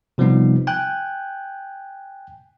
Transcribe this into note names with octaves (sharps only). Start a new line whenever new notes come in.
C3 F3 G3 B3 D#4
G5 G#5 F#6 G6